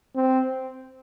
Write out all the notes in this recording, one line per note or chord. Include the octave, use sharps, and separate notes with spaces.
C4